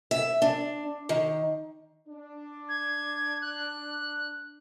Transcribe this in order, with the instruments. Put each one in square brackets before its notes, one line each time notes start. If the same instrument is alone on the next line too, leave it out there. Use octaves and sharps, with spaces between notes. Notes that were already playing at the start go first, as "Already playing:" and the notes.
[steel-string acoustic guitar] E5
D4
D#3
[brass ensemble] D4
[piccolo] G#6
F#6